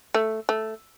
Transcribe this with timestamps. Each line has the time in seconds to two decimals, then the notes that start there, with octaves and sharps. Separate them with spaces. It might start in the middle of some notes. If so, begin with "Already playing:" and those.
0.14 A3
0.49 A3